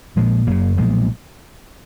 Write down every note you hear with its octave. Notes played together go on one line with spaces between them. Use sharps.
A#1 A#2 F3 G#3
F#1 F#2 C#3 F#3 A#3
B1 A#2 F3 G#3